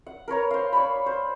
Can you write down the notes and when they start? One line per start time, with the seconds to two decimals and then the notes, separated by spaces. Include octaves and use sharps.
0.07 F#5
0.28 A#4 B4 C#5 A#5
0.51 C5 F5
0.73 C#5 D5 B5
1.06 C5